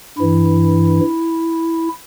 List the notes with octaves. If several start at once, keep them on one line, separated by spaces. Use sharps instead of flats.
G2 E3 E4